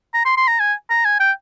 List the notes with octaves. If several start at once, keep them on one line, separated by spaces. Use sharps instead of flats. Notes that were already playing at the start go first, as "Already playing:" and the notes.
A#5
C6
C6
A#5
G#5
A#5
G#5
G5